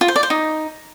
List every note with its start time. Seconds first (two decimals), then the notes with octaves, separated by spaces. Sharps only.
0.01 F4
0.08 C5
0.16 D5
0.23 C5
0.30 D#4